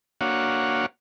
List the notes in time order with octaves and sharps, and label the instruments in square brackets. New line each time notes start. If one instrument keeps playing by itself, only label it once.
[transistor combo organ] A#3 D4 F#4 C#5 F5 F#5